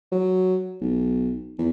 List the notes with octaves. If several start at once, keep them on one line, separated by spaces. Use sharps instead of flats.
F#3
B1
E2